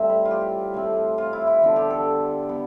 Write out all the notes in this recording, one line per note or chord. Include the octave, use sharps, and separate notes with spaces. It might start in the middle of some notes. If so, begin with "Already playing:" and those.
Already playing: A2 G3 C4 E5
B4
F4
G4
A2 F3 C4
F4
E4
E4
D3 F3 B3
G4
A4
B3